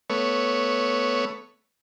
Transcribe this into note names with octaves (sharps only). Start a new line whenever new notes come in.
A3 B3 C#5